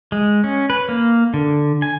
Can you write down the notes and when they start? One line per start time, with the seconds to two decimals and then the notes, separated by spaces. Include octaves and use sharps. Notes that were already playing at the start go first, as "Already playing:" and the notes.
0.12 G#3
0.44 C#4
0.70 B4
0.89 A#3
1.34 D3
1.82 G#5